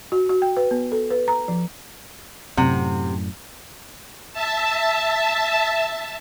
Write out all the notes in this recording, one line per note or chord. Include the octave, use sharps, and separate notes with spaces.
F#4
F#4
G5
B4
B3
A4
B4
A#5
F3
F#2 A2 C3 F#5
E5 A5